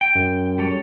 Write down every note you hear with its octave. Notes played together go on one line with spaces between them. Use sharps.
G5
F#2
G3 A4 C#5